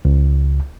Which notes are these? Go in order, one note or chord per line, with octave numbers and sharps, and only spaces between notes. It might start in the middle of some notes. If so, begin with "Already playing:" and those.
C#2